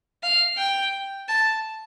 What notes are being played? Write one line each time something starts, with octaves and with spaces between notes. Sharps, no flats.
F5
G5
A5